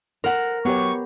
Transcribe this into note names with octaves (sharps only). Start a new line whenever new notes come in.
A#4 C5 F#5
F#3 B3 G4 C#5 C#6